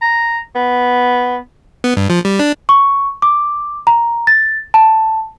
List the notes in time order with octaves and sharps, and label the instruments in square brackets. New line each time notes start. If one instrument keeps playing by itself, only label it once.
[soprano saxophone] A#5
B3
[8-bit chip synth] B3
G2
F3
G3
D4
[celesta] C#6
D6
A#5
A6
A5